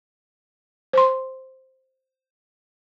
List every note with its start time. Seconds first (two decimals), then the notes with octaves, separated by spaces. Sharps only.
0.93 C5 C6